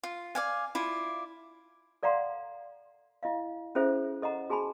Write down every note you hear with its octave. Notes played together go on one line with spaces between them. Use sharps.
F4
D5 F5 G#5
E4 F4 D5
A4 D5 F5 F#5 A#5 C6
E4 D#5 F5
C#4 E4 G#4 A4 C5 E5
A4 D#5 F#5 A#5
F#4 G#4 G#5 A5 B5